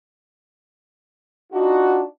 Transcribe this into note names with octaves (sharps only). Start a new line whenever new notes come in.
D4 D#4 F4 F#4